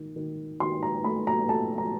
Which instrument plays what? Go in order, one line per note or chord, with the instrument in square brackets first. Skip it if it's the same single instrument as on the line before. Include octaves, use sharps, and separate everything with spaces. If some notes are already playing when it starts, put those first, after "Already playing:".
Already playing: [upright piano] D#3
D#3
D#3 C6
A#5
A3 B5
A#5
A3 A5
A#5